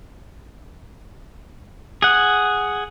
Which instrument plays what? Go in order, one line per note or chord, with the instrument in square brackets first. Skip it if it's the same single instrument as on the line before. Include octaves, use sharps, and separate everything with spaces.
[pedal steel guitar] G#4 F#5